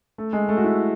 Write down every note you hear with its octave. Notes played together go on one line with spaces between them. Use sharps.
A3
G#3
A3
F#4
E4